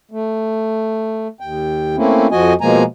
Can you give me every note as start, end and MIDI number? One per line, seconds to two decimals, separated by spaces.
0.11 1.28 57
1.40 1.96 39
1.40 1.96 79
1.97 2.27 57
1.97 2.27 58
1.97 2.27 60
1.97 2.27 61
1.97 2.27 64
2.32 2.53 41
2.32 2.53 53
2.32 2.53 66
2.32 2.53 75
2.32 2.53 80
2.61 2.83 47
2.61 2.83 53
2.61 2.83 56
2.61 2.83 58
2.61 2.83 80
2.61 2.83 82